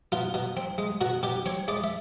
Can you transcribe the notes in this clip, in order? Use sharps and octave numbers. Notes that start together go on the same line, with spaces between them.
B2 F4
B2
C4
G#3
B2 F#4
B2 G4
C4 C#5
G#3 D5
E5